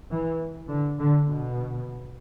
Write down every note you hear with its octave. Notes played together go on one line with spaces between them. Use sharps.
E3
D3
D3
B2